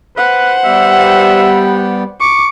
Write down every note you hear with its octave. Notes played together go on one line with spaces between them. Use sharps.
B4 C5 F#5
G3 B3 G4 E5
C#6 D6